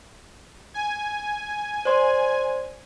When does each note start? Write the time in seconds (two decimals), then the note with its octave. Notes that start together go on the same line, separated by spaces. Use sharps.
0.74 G#5
1.85 C5 D5 C6